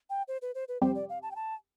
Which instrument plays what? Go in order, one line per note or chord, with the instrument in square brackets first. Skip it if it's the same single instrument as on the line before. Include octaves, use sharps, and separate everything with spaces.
[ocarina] G5
C5
B4
C5
B4
[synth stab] F2 C3 G3 C4 G4 [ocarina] C5
[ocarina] D5
F5
A5
G5
A5